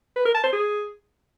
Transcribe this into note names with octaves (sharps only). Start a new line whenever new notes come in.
B4
A#4
A5
C5
G#4